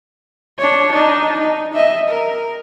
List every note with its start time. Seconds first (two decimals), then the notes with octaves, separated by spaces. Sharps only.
0.59 D4 C#5
0.91 D4 D#4
1.39 D#4
1.73 D#5 E5
2.09 A#4